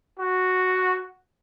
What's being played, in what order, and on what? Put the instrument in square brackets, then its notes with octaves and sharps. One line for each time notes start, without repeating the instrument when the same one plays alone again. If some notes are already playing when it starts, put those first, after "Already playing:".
[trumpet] F#4